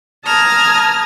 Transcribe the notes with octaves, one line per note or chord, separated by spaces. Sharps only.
A5 A#5 D#6 F6 G#6